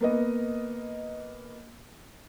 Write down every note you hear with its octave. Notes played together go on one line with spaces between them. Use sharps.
A#3 B3 D#5